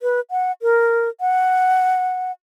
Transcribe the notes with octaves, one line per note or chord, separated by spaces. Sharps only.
B4
F#5
A#4
F#5